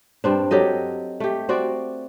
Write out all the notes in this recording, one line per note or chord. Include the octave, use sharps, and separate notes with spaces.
G2 C4 D4
F#3 G4 A4 D#5
A3 G4
C4 F#4 D5